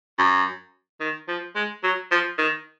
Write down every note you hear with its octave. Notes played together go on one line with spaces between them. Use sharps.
F#2
D#3
F3
G#3
F#3
F3
D#3